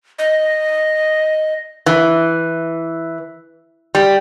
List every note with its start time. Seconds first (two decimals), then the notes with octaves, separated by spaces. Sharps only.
0.19 D#5
1.86 E3
3.95 G3